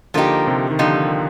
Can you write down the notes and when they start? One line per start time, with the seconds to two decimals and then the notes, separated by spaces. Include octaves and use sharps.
0.14 D3 F3 A#3 D#4 G4
0.47 C3
0.71 D#3
0.79 D3 F3 A#3 D#4 G4